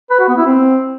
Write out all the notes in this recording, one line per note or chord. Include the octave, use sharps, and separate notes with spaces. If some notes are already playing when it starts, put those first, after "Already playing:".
B4
F#4
B3
E4
C4